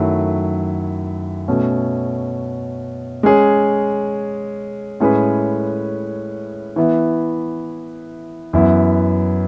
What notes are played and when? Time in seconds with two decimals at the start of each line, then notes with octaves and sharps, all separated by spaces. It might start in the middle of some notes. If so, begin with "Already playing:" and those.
Already playing: F#2 D#3 F#3 A3 E4
1.48 B2 A3 C#4
3.23 G#3 C#4 G#4 C#5
5.00 A2 G#3 C#4 G#4 B4
6.76 E3 B3 E4
8.53 F#2 E3 B3 E4